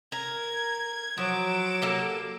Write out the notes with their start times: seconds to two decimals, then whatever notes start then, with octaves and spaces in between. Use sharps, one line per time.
0.12 A#4 G#6
1.18 F3 F#3 D6 E7
1.82 G3 A#3 A4